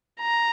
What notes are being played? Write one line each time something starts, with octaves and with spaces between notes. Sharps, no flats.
A#5